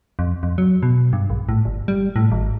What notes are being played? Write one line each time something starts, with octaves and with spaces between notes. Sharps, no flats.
F2
F2
F#3
B2
G2
A#1
A2
G1
G3
A2
G#1